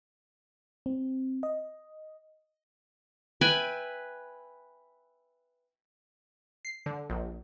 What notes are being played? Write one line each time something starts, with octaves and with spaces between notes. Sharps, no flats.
C4
D#5
B4 E5 G5 G#5
C7
D3
A#1